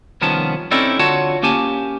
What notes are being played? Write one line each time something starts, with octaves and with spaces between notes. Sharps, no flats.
C2 D#3 F3 B3 C#4 A5
C4 C#4 D#4 E4 A4 D5
D3 F4 F#4 C#5 F#5 A5
A#3 C#4 G4 G#5 A5